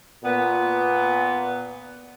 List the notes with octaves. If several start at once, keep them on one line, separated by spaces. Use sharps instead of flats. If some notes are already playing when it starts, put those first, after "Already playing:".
A#2 B3